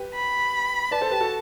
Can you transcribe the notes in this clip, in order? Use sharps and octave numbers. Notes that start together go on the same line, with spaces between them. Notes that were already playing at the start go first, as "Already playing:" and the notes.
Already playing: G4 B4
B5
B4 D5 A5
A4 C5
G4 B4
F#4 A4